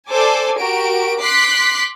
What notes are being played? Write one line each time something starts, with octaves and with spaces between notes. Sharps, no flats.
A4 C5 D5 G#5 D6
F#4 G4 A#4 D7
C6 D6 F#6 B6 C7